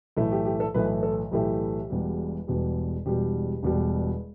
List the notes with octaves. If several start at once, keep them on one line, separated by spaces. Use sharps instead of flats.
B1 A2 E3 A3 E4
G4
G4
A4
B1 A2 E3 A3 B4
A4
B1 A2 E3 A3 G4
E1 E2 B2 G3
E1 E2 B2 G3
E1 E2 B2 G3 G4
E1 E2 B2 G3